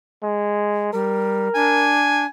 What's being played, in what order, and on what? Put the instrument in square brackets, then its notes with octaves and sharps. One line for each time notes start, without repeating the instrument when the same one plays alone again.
[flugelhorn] G#3
[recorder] G3 [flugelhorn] A#4
[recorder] D4 [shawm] G#5